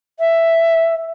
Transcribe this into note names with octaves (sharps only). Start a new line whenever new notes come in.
E5